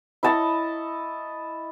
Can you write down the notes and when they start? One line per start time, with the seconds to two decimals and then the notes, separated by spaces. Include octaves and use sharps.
0.23 E4 D#5 A5 C#6